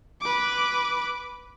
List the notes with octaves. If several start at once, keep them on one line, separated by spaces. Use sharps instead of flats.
B4 D6